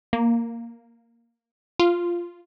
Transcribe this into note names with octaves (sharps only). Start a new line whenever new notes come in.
A#3
F4